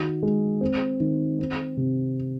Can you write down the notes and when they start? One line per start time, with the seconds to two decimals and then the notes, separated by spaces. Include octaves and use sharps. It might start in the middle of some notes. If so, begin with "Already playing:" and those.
Already playing: D#3 F#4
0.23 G#3
0.61 C4
1.00 D#3
1.39 C4
1.77 C3